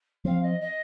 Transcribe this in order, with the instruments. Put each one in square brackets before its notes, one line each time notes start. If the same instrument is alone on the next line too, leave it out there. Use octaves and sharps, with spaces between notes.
[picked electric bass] F3 C4 [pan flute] F5
[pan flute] D#5
D#5